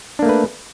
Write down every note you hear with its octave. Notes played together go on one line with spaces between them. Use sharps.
A3 A#3 D4 B4